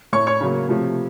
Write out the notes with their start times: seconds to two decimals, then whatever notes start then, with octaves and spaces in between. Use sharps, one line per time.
0.13 A2 A3 C#5 C#6
0.27 C#5 C#6
0.41 C#3 F#3 A#3
0.69 C3 F3 A3